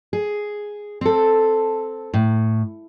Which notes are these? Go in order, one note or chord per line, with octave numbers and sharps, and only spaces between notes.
G#4
C4 A4
A2